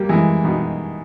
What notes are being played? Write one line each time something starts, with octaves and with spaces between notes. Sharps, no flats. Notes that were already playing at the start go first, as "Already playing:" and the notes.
Already playing: G3 A#3
E3 G#3
B2 D#3